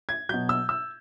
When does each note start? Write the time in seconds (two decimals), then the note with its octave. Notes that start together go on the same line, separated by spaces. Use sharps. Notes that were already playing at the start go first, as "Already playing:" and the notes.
0.09 G#6
0.29 B2 F#3 G6
0.49 E6
0.69 E6